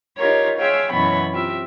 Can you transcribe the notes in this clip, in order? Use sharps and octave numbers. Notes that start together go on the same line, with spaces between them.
D#4 F4 G4 A#4 C#5
G#4 C#5 E5 F5 G5 C6
F#2 B2 E3 B3 C#5 B5
C4 F4 G4 E5